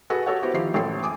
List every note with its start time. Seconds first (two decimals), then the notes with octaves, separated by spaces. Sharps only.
0.10 F#4 G#4 A4 B4
0.26 F#4 G4 A4 C#5 F#5
0.42 B3 E4 F#4 G4 C5
0.54 D#3 F3 E4 F4 G4 C7
0.74 A1 A4 G5 C7
1.03 G#5 D6 D#6